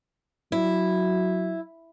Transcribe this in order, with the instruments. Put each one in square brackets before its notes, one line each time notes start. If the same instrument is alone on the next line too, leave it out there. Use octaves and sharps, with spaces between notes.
[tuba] F#3 [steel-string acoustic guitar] E4